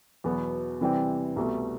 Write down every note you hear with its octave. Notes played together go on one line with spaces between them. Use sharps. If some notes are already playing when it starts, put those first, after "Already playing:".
E2 B2 F#3 B3
C3 E3 G3 C4
C2 B2 A3